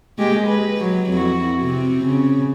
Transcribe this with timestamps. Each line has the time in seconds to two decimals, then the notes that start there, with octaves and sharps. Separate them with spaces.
0.18 G#3 A#3 G4
0.47 B4
0.78 F#3
1.11 F2 E4 F#4
1.62 C3 C4
2.05 C#3